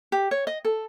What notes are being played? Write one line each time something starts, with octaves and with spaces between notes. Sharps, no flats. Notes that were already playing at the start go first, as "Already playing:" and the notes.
G4
C#5
D#5
A4